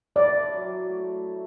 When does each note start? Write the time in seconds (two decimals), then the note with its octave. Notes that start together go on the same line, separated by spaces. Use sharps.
0.16 E4 D5
0.53 F#3
0.89 A3
1.27 E4